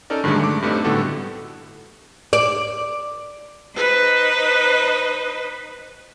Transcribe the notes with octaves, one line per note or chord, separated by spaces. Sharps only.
C#4 D#4 A4 A#4 D5
G2 D3 D#3 F#3 G#3 A3
A3 D6
G2 G3 A3 C4 D#4
A2 D3 G3 B3 F#4 A4
D5
D#4 B4 C5 D#5